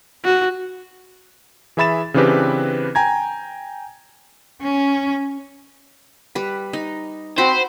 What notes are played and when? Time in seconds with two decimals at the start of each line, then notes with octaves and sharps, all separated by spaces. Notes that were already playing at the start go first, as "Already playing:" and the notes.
0.24 F#4
1.77 E3 G#4 E5 B5 A6 E7
2.14 C#3 E3 C4 D4 G4 B4
2.95 G5 G#5 A#5 G#6
4.62 C#4
6.35 G3 B4
6.73 D#4
7.38 C4 F#4 C5 B5 C6